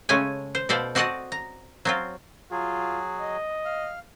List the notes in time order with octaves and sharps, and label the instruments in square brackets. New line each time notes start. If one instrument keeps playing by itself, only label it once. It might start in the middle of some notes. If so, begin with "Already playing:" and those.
[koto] C#3 G#3 A3 C#5 G#5
C5
B2 A4 C5 D5 F5
C4 F#4 D5 D#5 F#5 A5
A#5
F#3 C4 F4
[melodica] F#3 G#4 [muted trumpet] F4
[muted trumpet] D#5
[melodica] F5